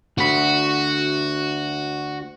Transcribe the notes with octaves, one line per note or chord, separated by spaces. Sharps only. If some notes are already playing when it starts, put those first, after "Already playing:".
D2 F#4 B5